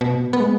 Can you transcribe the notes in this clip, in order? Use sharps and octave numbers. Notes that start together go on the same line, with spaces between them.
B2
B3
G#3